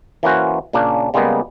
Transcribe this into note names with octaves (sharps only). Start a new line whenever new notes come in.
E3 A#3 C#4 F#4 C5
A#2 C#3 A#3 C#4 D4
C#3 G3 G#3 A#3 B3